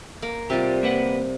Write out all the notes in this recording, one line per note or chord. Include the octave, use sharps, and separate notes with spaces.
A#3
C3 G3 F4 G4
A#3 B4 F#5